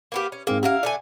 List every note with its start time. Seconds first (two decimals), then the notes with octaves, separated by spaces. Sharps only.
0.12 A#3 B3 G4
0.32 C#4
0.47 G#2 A#3 C4 G#4
0.63 C#4 E4 G4 A#4 F5 F#5
0.83 D3 A3 D5 G#5